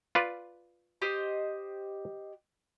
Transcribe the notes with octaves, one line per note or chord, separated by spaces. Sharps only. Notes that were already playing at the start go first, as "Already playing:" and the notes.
F4 B4 D5
G4 C5 D#5